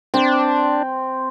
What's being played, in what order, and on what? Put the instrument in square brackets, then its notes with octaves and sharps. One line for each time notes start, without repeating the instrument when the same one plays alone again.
[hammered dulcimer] C4 [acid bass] D4